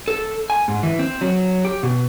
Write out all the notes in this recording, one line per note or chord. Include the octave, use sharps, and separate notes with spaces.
A4
G#5
G#2
E3
C4
F#3
G4
B2